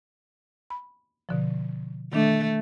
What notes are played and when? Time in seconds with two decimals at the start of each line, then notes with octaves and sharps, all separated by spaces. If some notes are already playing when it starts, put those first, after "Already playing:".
0.70 B5
1.29 B2 D3 F3
2.13 D#3 A3 D4